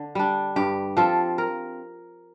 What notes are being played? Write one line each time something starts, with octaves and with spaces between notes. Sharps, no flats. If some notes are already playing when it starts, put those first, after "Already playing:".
Already playing: D3
G3 D4
G2 G4
F3 C4 F4 A4
A#4